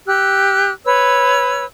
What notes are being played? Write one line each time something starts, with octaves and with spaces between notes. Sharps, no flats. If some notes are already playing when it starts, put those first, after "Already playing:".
G4 E6 F#6
B4 C#5 E6